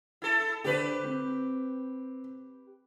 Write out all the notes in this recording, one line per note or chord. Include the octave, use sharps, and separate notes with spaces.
E4 A4
D3 G4 B4 C5
C4